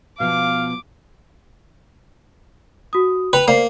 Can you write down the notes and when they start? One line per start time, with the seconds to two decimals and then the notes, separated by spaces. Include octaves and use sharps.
0.20 B2 F3 F5 D6
2.93 F#4 D#6
3.33 B4 G5 F7
3.48 A#3 C5 D5 C7